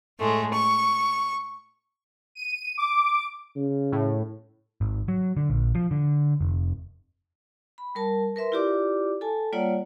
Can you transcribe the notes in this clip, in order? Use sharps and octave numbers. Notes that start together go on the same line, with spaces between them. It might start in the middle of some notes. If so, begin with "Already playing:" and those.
A2 G#3 A3
C#6
D#7
D6
C#3
A2
G#1
F#3
D3
A#1
F3
D3
F1
B5
G3 A#4 A5
A#4 B4 E5 C6
E4 F4 G4 D5 D6
A4 G#5 A5
G3 A#3 F4 C#5 D5 F#5